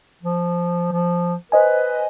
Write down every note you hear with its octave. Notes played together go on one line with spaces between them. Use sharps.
F3
F3
B4 C5 D#5 G#5